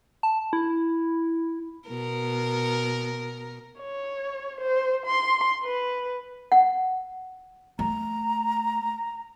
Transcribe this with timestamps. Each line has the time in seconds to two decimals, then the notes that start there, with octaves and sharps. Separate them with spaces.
0.23 A5
0.53 E4
1.89 B2 A#4
3.79 C#5
4.60 C5
5.06 C6
5.63 B4
6.52 F#5
7.79 A3 A#5